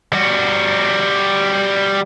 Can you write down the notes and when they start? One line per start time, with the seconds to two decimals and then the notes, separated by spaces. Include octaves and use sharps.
0.13 G3 F#4